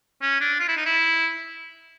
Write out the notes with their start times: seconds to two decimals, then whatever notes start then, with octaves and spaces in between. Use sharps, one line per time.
0.22 C#4
0.41 D4
0.60 F4
0.69 E4
0.77 D#4
0.85 E4